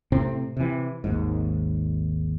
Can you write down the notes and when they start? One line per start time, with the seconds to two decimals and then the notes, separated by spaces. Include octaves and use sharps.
0.12 A2 C3 C4
0.57 C3 E3
1.04 G#1 D#2 G#2